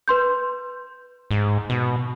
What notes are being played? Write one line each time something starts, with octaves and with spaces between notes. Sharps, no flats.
B4 C6 G6
G#2
B2